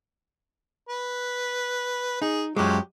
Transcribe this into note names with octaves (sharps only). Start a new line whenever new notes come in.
B4
D#4 G#4
F#2 F3 F#3 G#3 G4